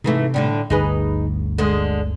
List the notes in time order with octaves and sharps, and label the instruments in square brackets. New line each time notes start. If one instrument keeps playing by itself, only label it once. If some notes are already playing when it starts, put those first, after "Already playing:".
[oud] G#2 E3 A3 [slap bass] C3
[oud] A2 D3 G3
[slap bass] G1 D2 [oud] D#4 G#4 B4
[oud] D3 G#3